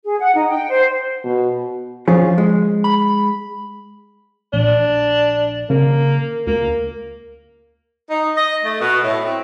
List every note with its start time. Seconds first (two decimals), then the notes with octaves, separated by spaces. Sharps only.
0.04 G#4
0.20 F#5
0.34 D#4
0.49 G5
0.70 C5
1.25 B2
2.08 F3 C#4 F4 G#4
2.38 G#3
2.84 B5
4.53 A#1 D4
5.70 C#3 A#3
6.47 D2 A#3
8.10 D#4
8.36 D#5
8.64 A3
8.81 B2
9.03 A2
9.25 C4